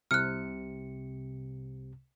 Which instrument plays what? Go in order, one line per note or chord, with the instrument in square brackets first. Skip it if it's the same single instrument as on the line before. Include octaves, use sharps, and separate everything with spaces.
[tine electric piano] C2 C3 C#7 [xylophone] F6 F#6